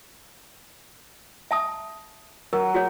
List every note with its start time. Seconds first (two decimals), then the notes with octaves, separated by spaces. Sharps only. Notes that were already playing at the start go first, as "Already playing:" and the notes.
1.51 E5 A5 D#6
2.53 F#3 A#4
2.74 F#4 G#4 C#5